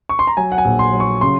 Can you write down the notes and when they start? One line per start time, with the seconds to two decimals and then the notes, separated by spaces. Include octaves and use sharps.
0.09 C#6
0.19 C6
0.27 A#5
0.37 F#3 G#5
0.52 F#5
0.58 G#5
0.65 A#1
0.79 C6
0.93 F#3
1.00 C#6
1.21 C#3 C6